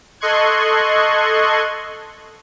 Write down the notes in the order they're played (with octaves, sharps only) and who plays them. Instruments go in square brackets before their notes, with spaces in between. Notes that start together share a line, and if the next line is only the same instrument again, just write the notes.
[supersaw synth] A4 D#5 C6 C#6 F#6 G#6